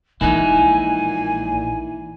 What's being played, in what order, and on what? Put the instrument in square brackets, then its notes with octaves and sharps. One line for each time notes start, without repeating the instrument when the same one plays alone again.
[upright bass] A#1 G#3 [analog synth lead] A#2 [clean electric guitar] E3 D#4 E4 [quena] G#5